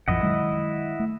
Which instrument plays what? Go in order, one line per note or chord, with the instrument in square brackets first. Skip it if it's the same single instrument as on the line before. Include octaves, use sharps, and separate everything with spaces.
[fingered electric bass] A#1 F#2 F3 [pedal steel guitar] E4 D#5 F#5
[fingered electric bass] D#3 F#3 G#3
A3